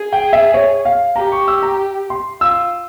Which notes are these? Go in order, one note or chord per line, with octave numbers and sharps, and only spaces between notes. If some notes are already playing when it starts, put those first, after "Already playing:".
Already playing: G#4
G5
E5
C#5
F5
G4 A#5
C#6
E6
A#5
C6
F4 E6